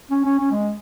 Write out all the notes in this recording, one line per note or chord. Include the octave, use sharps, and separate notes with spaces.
C#4
C#4
C#4
G#3